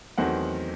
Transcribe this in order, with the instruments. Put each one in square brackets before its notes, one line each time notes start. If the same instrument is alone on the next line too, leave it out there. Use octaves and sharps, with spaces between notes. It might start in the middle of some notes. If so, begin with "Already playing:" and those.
[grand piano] E2 D#3 F#3 A3 C4 F#5